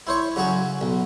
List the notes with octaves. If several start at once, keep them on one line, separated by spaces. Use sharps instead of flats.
E4 C5 C#5
C#3 F#3 F#4 G#4
B1